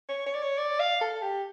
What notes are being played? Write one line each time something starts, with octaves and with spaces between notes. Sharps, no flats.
C#5
C#5
D5
C#5
D5
F5
A4
G4